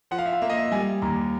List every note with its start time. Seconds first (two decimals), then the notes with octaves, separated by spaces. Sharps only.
0.11 F3 F#5
0.18 F5
0.26 E5
0.33 F5
0.42 A#3 E5
0.49 D#5
0.57 E5
0.72 G3 G#5
1.02 D#2 A#5